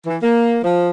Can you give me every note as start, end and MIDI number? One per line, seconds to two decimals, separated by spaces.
0.06 0.16 52
0.22 0.59 58
0.63 0.90 53